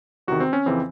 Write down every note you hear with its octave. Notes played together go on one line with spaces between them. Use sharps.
E2 C3 D#3 F#4
C4
C#4
F2 C#3 E3 C4